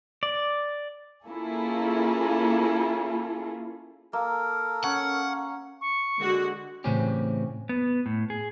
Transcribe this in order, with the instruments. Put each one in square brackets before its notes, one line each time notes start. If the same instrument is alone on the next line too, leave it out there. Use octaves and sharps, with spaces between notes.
[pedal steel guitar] D5
[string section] A#3 C#4 E4 F4 G#4 A4
[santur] A#3 [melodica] A4 A#4
[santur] C#4 [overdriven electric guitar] F#5
[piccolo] C#6
[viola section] D3 G#3 F#4
[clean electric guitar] A2 C#3 E3 C4 C#4 G4
[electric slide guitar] B3
A2
G#4